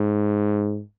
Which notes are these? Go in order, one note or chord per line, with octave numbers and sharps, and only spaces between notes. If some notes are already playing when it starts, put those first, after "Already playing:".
Already playing: G#2